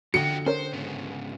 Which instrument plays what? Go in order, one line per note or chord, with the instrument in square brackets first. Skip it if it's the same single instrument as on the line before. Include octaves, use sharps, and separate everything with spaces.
[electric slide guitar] E2 F3 G5 [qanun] D3 D#5 [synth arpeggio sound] F#4 [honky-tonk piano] C#7
[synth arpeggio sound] C#4 A#4 C#5 [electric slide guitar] C5
[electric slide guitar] G#2 C#3 B3